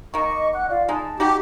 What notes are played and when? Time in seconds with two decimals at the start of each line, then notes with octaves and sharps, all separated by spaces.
0.14 D#3 A#3 D#5 C#6
0.53 F#5 F#6
0.69 F4 D5 F5
0.89 G#3 D#4 A5
1.20 D#4 F#4 G4 G5